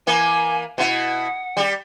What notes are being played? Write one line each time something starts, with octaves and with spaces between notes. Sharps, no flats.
E3 A#3 G#5
B2 E4 F#5
G3 G4